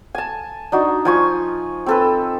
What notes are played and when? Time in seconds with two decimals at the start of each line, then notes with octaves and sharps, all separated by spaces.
0.15 G#5 A5
0.72 D4 D#4 F#4
1.05 F3 G#5 C#6
1.86 C4 A4 B4